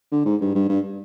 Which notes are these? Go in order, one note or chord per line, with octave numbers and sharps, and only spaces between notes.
D3
G#2
G2
G2
G2